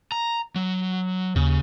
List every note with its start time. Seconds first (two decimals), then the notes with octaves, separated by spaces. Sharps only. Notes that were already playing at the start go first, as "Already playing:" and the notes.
0.12 A#5
0.56 F#3
1.36 D#2 C#3